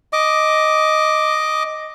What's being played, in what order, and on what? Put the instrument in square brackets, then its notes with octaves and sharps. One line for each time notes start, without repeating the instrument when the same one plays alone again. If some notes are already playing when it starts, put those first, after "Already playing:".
[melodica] D#5 D6